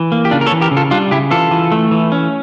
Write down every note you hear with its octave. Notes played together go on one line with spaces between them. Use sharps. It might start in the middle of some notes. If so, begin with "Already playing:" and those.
Already playing: E3
A#3
G4
C#3 D4 F4
A#4
A4 C#5
E3
G4 A#4
C#3
F4 A4
G3 D4 F4
C#3 E4 G4
E3 F4 A4
E3
A3
E3
C#4